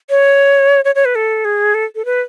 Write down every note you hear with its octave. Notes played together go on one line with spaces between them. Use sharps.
C#5
C#5
C#5
B4
A4
G#4
A4
A4
B4